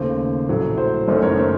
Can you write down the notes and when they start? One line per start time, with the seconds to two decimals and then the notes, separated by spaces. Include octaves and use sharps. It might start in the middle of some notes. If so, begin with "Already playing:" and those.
Already playing: D#2 C#3 A3 C5
0.49 A#1 A2 F#3 A3
0.78 C5
1.08 F#1 F#2 D#3 A3 C5
1.23 A#4 C#5
1.37 C5